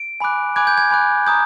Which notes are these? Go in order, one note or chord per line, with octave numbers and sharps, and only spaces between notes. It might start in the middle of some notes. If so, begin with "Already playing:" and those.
Already playing: D7
G#5 B5 D6 F#6
G#5 B5 D6 F#6 G#6
G6
G#6
G#5 B5 D6 F#6
A#5 D#6 G6